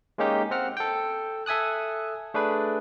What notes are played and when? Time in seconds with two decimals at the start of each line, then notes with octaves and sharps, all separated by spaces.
0.18 G#3 A#3 C#4 D#4 G4
0.51 C4 F#5 F6
0.77 A4 G5
1.46 A4 E5 G#5 D#6 F#6
2.34 A3 D4 G#4 B4